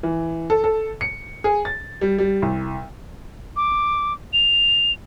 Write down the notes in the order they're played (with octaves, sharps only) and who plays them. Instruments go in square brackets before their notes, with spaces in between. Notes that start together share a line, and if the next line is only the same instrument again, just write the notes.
[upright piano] E3
A4
A4
C#7
G#4
A6
G3
G3
C2
[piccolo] D6
F7